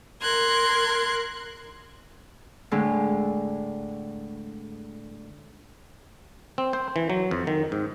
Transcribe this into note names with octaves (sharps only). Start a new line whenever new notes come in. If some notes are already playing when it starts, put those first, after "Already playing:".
A#4 C6 F#6 G#6
A2 D3 G#3
C4
C5
E3
F#3
F2
D#3
G#2